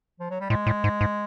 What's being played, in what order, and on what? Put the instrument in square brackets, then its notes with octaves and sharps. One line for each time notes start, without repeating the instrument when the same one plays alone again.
[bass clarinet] F3
F#3
G3
[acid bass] A2 [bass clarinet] G#3
[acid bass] A2
G#2
G#2